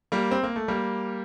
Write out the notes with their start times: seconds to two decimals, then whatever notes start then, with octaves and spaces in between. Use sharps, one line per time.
0.12 G3 A#3
0.31 C4
0.43 A#3
0.56 A3
0.68 G3 A#3